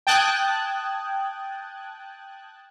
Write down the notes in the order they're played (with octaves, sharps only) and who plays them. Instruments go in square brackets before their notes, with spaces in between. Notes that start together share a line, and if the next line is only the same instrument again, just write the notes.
[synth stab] G5 A5 D#6 F#6 G#6 A6